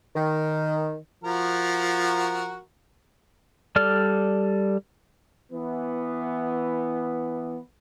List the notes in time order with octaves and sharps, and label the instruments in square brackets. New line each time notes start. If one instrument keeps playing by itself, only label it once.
[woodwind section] D#3
[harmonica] F3 F#4 A#4
[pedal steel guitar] G3 A4 D5 F6
[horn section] E3 B3